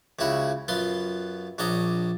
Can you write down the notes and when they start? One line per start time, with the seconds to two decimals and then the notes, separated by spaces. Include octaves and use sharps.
0.19 C#2 C#3 E4 F#4 C#5
0.68 F#2 B3 F4 C6
1.58 A#1 D4 C#5 D#5 A#5 D#6